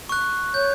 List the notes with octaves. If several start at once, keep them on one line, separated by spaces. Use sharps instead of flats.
C#6 F#6
C#5 G6